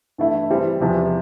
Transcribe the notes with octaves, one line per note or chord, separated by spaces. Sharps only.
G2 E3 A3 E4
E3 G3 C4 E4
E2 C3 F3